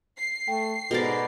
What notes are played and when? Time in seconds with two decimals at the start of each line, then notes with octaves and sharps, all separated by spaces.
0.19 C7
0.48 A3 G5
0.91 G#2 B2 A4 A#4 D5